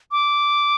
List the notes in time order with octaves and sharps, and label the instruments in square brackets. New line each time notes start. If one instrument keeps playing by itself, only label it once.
[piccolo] D6